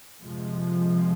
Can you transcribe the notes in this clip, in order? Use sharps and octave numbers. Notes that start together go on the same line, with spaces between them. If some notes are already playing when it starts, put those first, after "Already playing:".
F2 C3 F3 G#3